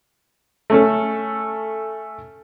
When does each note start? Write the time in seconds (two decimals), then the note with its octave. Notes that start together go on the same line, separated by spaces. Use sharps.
0.70 A3 C#4 A4